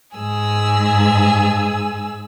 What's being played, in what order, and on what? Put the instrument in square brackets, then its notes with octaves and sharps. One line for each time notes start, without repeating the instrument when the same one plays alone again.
[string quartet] G#2 G#4 E6